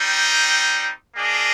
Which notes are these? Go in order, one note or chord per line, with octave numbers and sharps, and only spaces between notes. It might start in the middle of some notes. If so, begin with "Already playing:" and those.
Already playing: G3 C4 D#4
A#3 D4 G#4 D#5